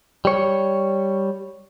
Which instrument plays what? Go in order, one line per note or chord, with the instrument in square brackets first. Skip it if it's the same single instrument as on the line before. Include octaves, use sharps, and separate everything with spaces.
[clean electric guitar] G3 C#5